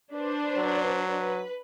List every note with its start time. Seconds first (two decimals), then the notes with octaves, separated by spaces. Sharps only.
0.12 D4 B4 C5
0.57 F#3
1.15 B4